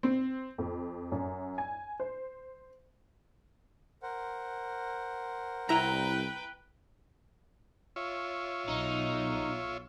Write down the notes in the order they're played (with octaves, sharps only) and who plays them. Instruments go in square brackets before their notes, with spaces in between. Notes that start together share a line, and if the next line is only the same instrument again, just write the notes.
[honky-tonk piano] C4
F2
F#2
G#5
C5
[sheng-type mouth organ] A#4 C5 F#5
[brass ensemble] C2 [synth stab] E4 A#5 [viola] B4 G5
[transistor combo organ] F4 C#5 E5
[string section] B1 [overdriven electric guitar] D#4